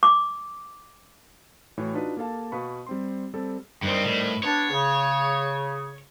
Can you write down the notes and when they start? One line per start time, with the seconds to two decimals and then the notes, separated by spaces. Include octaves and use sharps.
0.03 D6
1.78 A2 E3 F#4 C#5
1.94 D4 D#4 F4 F#4 B4
2.17 A#3 G4 A4 F5 A5
2.52 B2 B4 F5 B5 C#6
2.87 G3 C4 C6
3.34 G3 C4 A4
3.82 G2 C3 D#3 G3 C4
4.04 A2
4.43 B3 D4 C#5
4.70 C#3